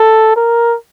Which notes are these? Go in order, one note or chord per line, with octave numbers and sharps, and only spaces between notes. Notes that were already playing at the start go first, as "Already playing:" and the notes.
Already playing: A4
A#4